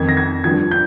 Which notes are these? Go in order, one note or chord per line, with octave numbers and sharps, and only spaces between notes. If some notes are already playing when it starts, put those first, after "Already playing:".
Already playing: F2 D#3 G#6
A#6
G#6
G2 F3 G#6
G6